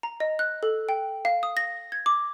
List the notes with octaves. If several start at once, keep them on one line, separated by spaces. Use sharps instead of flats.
A#5
D#5
F#6
A4
G5
F5
D#6
A#6
G#6
D6